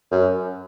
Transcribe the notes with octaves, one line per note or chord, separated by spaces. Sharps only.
F#2